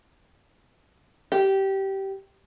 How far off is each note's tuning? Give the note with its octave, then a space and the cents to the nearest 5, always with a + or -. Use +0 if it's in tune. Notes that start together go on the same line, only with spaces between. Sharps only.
G4 -15